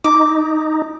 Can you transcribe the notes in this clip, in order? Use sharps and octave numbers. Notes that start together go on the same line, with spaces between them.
D#4 D6